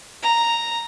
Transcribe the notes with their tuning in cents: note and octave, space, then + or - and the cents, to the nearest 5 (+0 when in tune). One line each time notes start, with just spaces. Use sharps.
A#5 -5